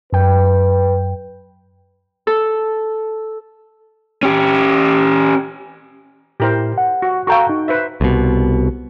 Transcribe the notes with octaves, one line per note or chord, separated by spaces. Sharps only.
F#2 B4 G5
A4
C#4 G4
A2 E4 G4 A#4 C5
F#5
F#4
F#4 A4 F5 G5 A#5 C#6
D#4
B4 C5 E5
C2 B2